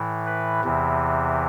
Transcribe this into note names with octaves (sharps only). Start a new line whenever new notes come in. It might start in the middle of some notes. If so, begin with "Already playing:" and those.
Already playing: A2 E3
B4
E2 C3 E3